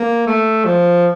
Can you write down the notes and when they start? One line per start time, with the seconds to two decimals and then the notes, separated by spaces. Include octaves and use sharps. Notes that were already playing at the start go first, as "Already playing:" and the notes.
Already playing: A#3
0.27 A3
0.65 F3